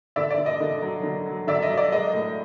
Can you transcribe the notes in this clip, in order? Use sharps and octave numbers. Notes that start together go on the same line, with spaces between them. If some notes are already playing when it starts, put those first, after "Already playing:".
D3 D5 E5
D5
D3
D#5
D3
F#3
D3
F#3
D3 D5 E5
D#5
F#3
D5
G#3 D#5
A2